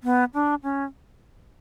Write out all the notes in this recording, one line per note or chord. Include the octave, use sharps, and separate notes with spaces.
B3
D4
C#4